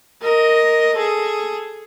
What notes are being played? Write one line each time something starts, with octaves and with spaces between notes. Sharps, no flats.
A#4 D#5
G#4 A4